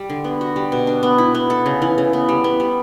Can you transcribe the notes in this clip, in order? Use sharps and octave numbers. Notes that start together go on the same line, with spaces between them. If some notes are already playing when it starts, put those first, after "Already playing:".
Already playing: G3
D3
B3
F#4
G3
B2
D4
B3
E4
B3
A4
C#3
E3
C#3
B3
G3
B3
G3